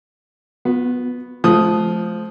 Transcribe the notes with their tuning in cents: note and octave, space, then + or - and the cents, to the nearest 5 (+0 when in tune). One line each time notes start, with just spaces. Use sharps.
B3 +0 F4 +45
F3 +0 A3 -40 D#6 +0